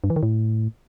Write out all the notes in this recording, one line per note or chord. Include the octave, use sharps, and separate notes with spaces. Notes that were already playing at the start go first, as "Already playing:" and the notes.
G2
E3
D#3
A2